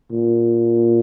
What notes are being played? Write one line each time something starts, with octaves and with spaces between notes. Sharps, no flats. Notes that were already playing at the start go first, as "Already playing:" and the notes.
A#2